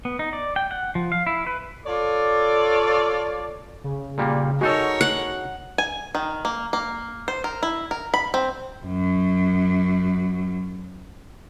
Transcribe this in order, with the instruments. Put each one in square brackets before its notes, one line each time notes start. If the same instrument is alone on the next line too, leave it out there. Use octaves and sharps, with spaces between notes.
[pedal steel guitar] B3
D#4
D5
G5
F#5
F3
F5
E4
B4
[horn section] F4 A4 C#5 D5
[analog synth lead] C#3
[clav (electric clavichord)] A#2 G3 A#3
[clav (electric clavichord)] G#3 D#4 A4 [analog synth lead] F#4 [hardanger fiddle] A#4 C#5
[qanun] F#5
[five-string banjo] G#5
D#3
A#3
A#3
C5
A#4
E4
A#4
B5
C4
[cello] F#2 F#3